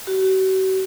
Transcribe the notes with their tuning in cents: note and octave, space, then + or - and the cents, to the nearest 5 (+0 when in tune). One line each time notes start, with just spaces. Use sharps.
F#4 +45